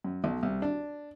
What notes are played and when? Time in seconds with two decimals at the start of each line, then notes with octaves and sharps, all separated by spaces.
0.04 F#2
0.24 B1
0.43 C2
0.62 D4